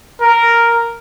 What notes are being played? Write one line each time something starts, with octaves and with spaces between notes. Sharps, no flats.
A#4